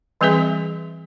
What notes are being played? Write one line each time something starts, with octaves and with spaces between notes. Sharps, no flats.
E3 G3 C4 G#4 B4 E5